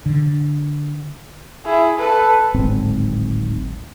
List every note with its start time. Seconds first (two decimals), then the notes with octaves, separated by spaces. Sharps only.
0.06 D3
1.65 E4 G#4
1.98 A4 B4
2.54 D1 G#1 G#2 C4